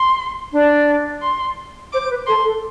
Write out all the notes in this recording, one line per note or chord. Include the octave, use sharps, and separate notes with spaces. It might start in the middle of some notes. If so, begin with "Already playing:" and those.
Already playing: C6
D4 D5
C6
C5 D6
C5
B4
A4 C6
A4